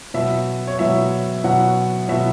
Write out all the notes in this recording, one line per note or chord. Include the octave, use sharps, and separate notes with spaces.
B2 F#3 E5
C#5
B2 F#3 E5
B2 F#3 F#5
B2 F#3 E5